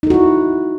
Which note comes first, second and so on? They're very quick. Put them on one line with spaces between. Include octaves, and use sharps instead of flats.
D#4 A4 F#4 E4